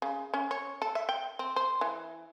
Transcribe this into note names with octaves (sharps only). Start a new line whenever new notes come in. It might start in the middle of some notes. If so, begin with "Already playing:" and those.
C#3
C#4
C#5
A4
E5
G5
C4
C5
E3